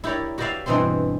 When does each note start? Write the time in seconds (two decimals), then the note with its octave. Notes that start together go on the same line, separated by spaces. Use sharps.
0.04 E4 G4 A#4 C#5 D5
0.38 F#4 G4 B4 D5 E5 F5
0.66 G2 B2 E3 C4 C5 C6